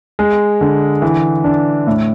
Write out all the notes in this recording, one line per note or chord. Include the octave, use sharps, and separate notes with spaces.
G#3
D3
E3
D4
A2